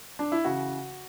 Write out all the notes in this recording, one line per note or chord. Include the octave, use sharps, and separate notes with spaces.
D4
E4
C#3 E3 F#4